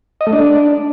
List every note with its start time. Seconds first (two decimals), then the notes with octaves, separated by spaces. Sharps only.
0.21 D#5
0.27 A3
0.33 D4